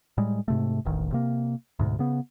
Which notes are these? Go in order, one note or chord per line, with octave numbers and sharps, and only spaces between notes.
A2 G3 G#3
G#2 C3 A3
E1 A1 D#3
C3 A#3
D2 G#2 B2
C#3 B3